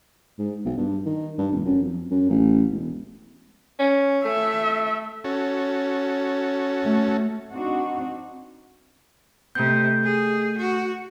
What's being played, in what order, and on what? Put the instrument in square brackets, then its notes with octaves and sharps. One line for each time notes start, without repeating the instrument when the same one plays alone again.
[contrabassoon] G#2
B1
G2
D#3
G2
F1
F#2
F2
F#2
A1
E1
[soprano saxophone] C#4
[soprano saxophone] A3 [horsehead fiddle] E5
[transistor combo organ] C#4 F#4 A4
[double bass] A3
[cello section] C4 D4 D#4 F#4
[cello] C3 [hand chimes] A3 G6
[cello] G#4
F#4